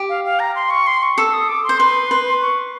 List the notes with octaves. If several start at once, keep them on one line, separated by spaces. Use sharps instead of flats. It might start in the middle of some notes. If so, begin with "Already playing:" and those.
Already playing: G4
F5
F5
A#5
C6
C#6
C6
C#6
A4 E6
D#6
D6
C6
C5
B4
B4
C#6